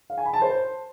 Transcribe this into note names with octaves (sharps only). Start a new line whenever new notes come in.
F5
G#5
B5
A5
C5